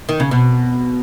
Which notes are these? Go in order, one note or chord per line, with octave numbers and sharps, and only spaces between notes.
D#3
C#3
B2